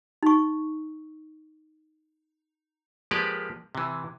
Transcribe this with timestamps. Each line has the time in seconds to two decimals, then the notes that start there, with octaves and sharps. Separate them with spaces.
0.23 D#4 C#6
3.11 F3 G#3 A#3 G4 B4 D5
3.75 C3 E3